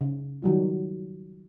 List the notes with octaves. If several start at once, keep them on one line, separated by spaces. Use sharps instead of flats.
C#3
D#3 F#3 G3 F4